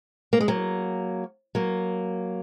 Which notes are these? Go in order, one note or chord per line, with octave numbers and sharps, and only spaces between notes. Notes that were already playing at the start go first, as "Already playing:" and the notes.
A#3
G#3
F#3 A#3
F#3 A#3